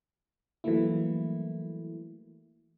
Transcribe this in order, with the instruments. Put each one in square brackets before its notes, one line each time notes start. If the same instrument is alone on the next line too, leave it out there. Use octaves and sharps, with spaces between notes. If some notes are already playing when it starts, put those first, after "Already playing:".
[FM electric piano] E3 F#3 G3 A3 A#3 E4